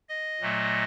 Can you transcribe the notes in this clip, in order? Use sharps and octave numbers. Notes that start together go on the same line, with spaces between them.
D#5
A#2 F#3 A3